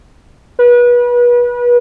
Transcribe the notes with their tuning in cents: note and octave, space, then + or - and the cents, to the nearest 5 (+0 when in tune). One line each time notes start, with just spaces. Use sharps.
B4 -30